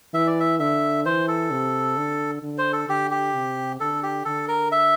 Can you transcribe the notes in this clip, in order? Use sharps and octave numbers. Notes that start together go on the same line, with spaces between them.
E3 E5
D5
E5
D3 E5
E3 C5
A4
C3
D3
D3
C5
A4
D3 G4
G4
C3
D3 A4
G4
D3 A4
A#4
E5